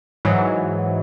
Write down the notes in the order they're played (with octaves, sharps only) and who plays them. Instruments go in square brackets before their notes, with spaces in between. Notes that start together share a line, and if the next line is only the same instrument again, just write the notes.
[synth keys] G#2 E3 F#3